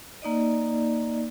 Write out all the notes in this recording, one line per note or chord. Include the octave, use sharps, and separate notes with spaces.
A#3 D#4 D5 D#5